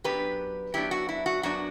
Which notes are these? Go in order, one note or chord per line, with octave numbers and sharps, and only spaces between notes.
F#2 F#3 B3 D4 G4 B4
F#2 F#3 B3 D4 E4 G4
F#4
E4
F#4
F#2 F#3 B3 D4 F#4